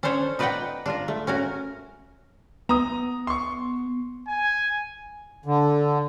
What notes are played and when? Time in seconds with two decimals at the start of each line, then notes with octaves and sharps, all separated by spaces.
0.03 C#4 D4 A4 C5 C#5
0.39 D#4 B4 D5 D#5 F#5 G5
0.86 D4 F4 A#4
1.08 A3
1.27 C#4 F#4 A#4
2.69 B3 A#5 D#6
3.27 C6 C#6
4.28 G#5
5.46 D3